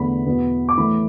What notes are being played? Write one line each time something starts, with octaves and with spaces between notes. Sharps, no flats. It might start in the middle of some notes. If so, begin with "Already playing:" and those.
Already playing: E2 D3 A3 B5
E2 B2 B3
D6
A2 E3 A3 B5